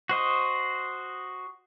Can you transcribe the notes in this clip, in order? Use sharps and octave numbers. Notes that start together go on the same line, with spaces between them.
F#4 C5 D#5